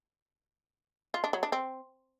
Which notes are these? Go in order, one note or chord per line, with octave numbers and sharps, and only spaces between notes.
F4
D4
F#3
D4
C4